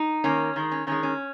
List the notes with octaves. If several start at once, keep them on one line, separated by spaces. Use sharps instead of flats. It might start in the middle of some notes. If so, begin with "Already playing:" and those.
Already playing: D#4
D#3 A#3 C#4
D#3 G#3
C#4
D#3 G#3 C#4
C#4